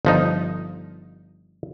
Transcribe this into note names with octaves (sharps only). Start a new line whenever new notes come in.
G1 F3 D#4